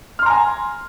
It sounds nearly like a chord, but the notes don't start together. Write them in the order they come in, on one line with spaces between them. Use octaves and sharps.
F6 C6 A#5 G#5